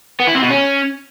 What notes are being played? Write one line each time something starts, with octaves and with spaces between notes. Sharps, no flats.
B3
E4
C4
B2
C#4